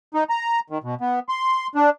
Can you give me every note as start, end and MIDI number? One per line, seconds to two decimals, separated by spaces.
0.14 0.24 63
0.30 0.60 82
0.70 0.78 51
0.84 0.95 47
1.01 1.20 59
1.29 1.67 84
1.75 1.90 62